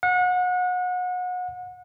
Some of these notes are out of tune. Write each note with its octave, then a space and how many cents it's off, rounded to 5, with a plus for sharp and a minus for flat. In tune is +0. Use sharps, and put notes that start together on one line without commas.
F#5 -30